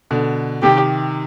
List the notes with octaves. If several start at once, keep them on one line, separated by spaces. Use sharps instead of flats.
B2 D3
C3 D#3 G4